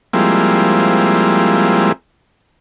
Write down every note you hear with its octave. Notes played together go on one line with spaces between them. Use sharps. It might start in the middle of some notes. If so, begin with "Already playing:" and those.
F3 G3 G#3 A#3 C4 E4